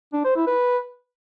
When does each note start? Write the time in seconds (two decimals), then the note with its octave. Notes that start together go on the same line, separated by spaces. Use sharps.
0.13 D4
0.25 C5
0.36 E4
0.47 B4